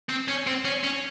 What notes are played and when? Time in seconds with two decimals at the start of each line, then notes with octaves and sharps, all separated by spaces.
0.09 C4
0.28 C#4
0.47 C4
0.65 C#4
0.84 C#4